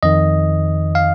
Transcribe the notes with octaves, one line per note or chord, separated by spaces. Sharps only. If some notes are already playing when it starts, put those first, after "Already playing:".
F2 D#3 D#5
F5